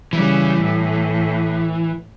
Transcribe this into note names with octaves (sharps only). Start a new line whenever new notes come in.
C#3 E3 G3
A2